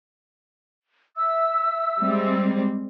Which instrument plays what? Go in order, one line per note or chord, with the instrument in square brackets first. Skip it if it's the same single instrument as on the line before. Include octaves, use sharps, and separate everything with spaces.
[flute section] E5 E6
[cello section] G3 G#3 C4